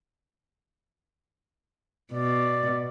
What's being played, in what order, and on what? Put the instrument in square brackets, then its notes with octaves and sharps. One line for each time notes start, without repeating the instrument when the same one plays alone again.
[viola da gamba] B2 [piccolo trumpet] D5